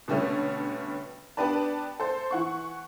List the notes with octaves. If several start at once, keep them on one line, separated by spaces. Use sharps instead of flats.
B2 D3 G3 A3 C#4
B3 D4 G4 B4 D5 A5
A4 C5
E3 F#5 C#6